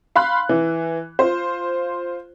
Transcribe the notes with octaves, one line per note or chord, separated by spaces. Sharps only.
F5 B5 C6 F#6
E3
F4 C5